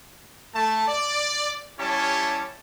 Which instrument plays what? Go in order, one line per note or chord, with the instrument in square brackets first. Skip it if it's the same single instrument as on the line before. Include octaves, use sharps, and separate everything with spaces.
[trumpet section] A3 A5
D5
G3 C#4 E4 G4 C#5 A5